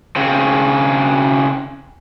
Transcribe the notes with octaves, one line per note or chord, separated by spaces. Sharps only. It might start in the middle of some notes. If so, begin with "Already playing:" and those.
C#3 C4